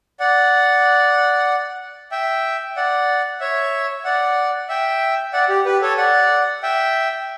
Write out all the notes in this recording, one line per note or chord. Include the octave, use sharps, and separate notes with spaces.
D5 F#5
E5 G5
D5 F#5
C#5 E5
D5 F#5
E5 G5
D5 F#5
G4
G4 B4
A4 C#5
D5 F#5
E5 G5